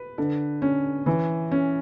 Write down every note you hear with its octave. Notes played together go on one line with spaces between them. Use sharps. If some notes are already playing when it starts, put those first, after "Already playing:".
Already playing: B4
D3
C#4
E3
C#4